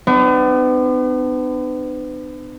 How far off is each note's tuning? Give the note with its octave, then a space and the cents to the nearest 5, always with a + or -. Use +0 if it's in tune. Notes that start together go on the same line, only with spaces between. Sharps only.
B3 +40 D4 +45